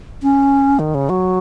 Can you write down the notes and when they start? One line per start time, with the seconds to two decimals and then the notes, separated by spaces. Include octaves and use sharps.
0.22 C#4
0.79 D#3
0.95 C#3
1.09 F#3